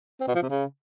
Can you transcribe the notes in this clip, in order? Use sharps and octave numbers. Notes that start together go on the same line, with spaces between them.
C4
B2
F3
C3
C#3